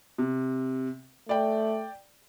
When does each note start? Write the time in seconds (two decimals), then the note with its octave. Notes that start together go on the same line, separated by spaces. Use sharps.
0.18 C3
1.29 A3 D5 G5